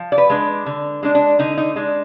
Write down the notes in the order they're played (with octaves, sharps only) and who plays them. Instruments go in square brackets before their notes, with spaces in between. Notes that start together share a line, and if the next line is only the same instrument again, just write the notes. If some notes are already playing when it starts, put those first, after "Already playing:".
Already playing: [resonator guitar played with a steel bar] F3
D5
B4
G#3 D4
D3
G#3 D4
D4
D3 D#4
D#4
G#3 D4